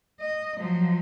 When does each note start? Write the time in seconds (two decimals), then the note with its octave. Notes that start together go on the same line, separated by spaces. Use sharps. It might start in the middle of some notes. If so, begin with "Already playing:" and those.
0.21 D#5
0.58 F3 F#3